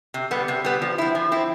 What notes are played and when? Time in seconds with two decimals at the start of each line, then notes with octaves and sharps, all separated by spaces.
0.14 C3
0.31 G3 B3
0.48 C3
0.65 G3 B3
0.82 F3
0.98 C4 E4
1.15 F3
1.32 C4 E4